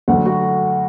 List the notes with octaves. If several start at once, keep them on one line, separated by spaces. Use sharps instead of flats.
D2 D3 F#3 A3 D4 F#5
F#4